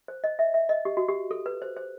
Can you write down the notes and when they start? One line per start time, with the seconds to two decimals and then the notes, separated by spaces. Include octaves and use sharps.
0.08 C5
0.24 D#5
0.39 E5
0.54 E5
0.69 D#5
0.85 G4
0.97 F#4
1.09 G4
1.31 A4
1.46 B4
1.62 C5
1.77 C5